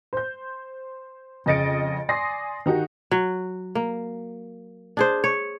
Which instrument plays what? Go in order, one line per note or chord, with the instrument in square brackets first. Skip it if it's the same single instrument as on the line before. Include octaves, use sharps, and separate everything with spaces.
[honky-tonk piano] C5 G6
F2 C#3 D#5 A6 C#7 D7
D5 G#5 C6 D#6 A#6 C7
D#3 D#4 F#4 G4
[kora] F#3
A#3
D4 G#4 C5
C#5